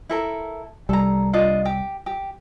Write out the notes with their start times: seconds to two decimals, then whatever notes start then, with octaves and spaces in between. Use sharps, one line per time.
0.09 E4 A4 A#4
0.89 C2 G3 A4 A#5
1.33 D4 F4 D#5
1.65 G4
2.06 G4